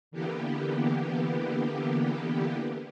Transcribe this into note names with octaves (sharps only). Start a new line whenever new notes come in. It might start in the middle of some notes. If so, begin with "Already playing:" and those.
D3 E3 A#3 B3 G4